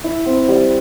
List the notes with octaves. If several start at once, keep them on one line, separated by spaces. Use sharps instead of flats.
E4
C4
G3